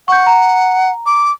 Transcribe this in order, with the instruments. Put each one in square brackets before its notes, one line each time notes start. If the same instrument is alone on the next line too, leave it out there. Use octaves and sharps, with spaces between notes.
[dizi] F#5 [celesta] C#6 G6
[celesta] A#5
[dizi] D6